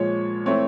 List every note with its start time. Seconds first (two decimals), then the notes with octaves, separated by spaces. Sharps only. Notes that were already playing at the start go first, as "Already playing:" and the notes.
Already playing: A#2 F3 G#3 C#5
0.46 E3 A3 C4 C#5